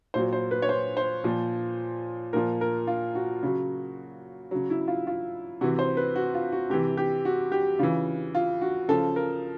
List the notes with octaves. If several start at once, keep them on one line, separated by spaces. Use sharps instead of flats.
A#2 F#3 C5
C5
B4
C#5
C5
C5
A#2 F3
A#2 F3 A#4
A#4
F4
F#4
C#3 F#3
C#3 F#3
E4
F4
F4
C3 E3 F#4
C5
B4
F#4
F4
F#4
C3 E3 G4
G4
F#4
G4
C#3 E3 F4
F4
F#4
C#3 F3 A4
A#4